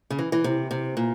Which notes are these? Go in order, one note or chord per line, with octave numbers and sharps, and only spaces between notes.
C#3
E3
E3
C3
C3
A#2